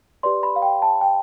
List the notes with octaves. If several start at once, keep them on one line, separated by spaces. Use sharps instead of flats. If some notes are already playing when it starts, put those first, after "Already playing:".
G4 B4 D5 C6
B5
F5
G5
A5
G5